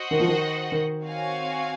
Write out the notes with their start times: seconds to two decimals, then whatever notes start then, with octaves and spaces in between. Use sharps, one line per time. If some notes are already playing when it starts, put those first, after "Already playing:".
Already playing: F#4 C5 D#5 F#5
0.11 D#3
0.20 F3
0.28 D#3
0.72 D#3
1.02 C4 F#4 C#5 F5 G#5